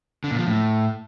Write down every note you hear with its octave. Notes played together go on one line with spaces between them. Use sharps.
D3
A#2
F3
A2